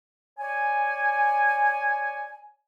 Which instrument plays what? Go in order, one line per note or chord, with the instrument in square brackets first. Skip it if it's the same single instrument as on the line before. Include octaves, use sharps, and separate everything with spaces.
[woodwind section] C#5 D5 G#5